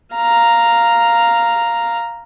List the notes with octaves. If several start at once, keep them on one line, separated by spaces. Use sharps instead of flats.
F5 A#5